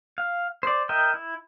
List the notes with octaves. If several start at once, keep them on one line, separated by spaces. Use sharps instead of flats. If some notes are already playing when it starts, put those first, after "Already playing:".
F5
C5 D5
A#4 D#5 E5 G5
E4